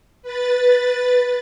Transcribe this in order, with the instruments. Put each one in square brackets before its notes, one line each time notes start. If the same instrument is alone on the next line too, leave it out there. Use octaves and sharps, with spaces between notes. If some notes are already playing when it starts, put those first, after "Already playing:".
[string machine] B4 A6